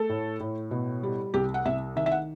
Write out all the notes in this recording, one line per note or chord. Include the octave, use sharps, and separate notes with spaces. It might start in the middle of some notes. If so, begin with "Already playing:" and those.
Already playing: A3 A4
A2
A2
B2
G3
C2 G4
F#5
C2 E5
D#3 E5
E5
F#5